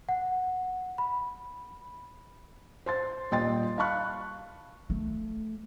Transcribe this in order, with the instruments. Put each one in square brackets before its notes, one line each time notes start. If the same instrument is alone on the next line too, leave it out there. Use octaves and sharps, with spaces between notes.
[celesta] F#5
B5
[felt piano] C5 C6 A6
D#1 A#2 D#5 G5 C6 A6
F5 A5 B5 C#6 F#6
[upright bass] A3